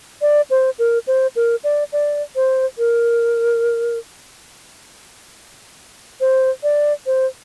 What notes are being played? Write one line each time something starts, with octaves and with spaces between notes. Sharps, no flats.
D5
C5
A#4
C5
A#4
D5
D5
C5
A#4
C5
D5
C5